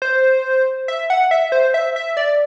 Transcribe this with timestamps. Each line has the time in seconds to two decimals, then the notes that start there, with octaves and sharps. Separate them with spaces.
0.02 C5
0.88 E5
1.10 F#5
1.31 E5
1.52 C5
1.74 E5
1.96 E5
2.17 D5